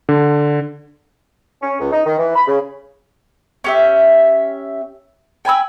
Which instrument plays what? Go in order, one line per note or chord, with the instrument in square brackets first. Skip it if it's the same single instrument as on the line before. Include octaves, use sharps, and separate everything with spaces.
[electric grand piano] D3
[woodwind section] C#4
C#2
D#4
D#3
E3
B5
C#3
[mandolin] C#4 G4 E5
G5 G#5 B5 E6